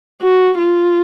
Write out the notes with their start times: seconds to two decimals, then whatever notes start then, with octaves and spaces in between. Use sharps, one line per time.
0.22 F#4
0.58 F4